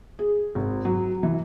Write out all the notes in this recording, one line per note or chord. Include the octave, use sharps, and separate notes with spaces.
G#4
G#1
F#3
E3